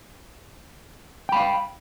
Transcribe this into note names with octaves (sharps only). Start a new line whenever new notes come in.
F5 G5 B5